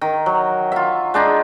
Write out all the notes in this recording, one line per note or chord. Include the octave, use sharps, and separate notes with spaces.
D#3
F#3
F4 E5
G#3 D4 D#4